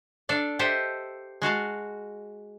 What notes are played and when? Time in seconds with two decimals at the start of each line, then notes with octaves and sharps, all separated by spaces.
0.29 D4 A4 D5 F5
0.59 G4 A4 C5 D#5 E5
1.42 G#3 F#4 F5 A5